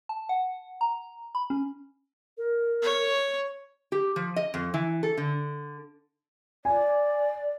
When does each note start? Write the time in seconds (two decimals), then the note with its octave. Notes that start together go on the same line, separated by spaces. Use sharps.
0.09 A5
0.29 F#5
0.81 A#5
1.35 B5
1.50 C#4
2.38 A#4
2.82 C#5
3.92 G4
4.16 F3
4.36 D#5
4.54 F2
4.74 E3
5.03 A4
5.17 D3
6.65 D5 G#5